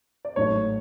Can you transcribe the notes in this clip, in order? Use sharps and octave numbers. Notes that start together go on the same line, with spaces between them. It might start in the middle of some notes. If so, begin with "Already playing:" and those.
D5
A1 G#2 F#3 A3 C#5